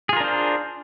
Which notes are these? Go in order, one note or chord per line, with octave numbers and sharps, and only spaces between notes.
D4 F4 G#4 A#4 C5